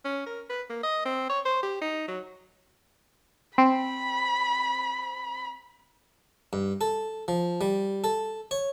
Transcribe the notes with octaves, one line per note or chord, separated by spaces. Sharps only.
C#4
A#4
B4
A#3
D#5
C4
C#5
C5
G4
D#4
F#3
C4 B5
G2
A4
F3
G3
A4
C#5